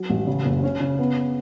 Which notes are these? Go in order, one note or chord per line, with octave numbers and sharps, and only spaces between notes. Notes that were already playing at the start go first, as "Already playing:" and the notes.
Already playing: F#3
A1
C#3
F#1
C#4
C#3
B3